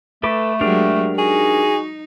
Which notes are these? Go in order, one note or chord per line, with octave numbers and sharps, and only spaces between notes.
A3 A4 B4 D6
F#3 G#3 D4 G4 A#4
D#4 F#4 G#4